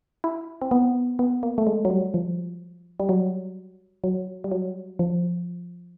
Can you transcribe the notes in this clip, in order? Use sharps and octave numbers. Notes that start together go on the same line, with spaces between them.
E4
C4
B3
B3
A#3
A3
G#3
F#3
G3
F3
G3
F#3
F#3
G3
F#3
F3